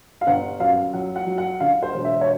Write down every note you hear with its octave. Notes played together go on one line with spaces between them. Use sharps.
F5
G1 F#5
F#2 F5
F#3 F#5
F#5
F#3
F#5
D3 F5
C5
E1
E5
C#5